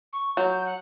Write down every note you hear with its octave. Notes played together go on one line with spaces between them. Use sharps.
C#6
F#3 G6
F#5